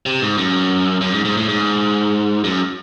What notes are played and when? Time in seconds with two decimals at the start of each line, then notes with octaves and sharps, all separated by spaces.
0.06 C3
0.22 G#2
0.38 F#2
1.01 F#2
1.14 G#2
1.25 G#2
1.37 A2
1.49 G#2
2.44 F#2